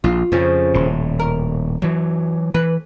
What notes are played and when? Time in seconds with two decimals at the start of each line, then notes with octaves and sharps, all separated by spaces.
0.04 A#1 F4
0.32 F2 C#3 F3 C#4
0.74 D#1 A2
1.19 A#4
1.82 F#2 E3 F#3
2.54 E3 B4